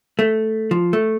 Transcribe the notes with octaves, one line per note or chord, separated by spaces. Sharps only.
A3
F3
A3